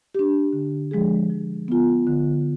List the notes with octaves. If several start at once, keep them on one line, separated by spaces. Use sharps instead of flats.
D4 G4
D3
F3 G#3 D4 G#4
F3
B3 F4
D3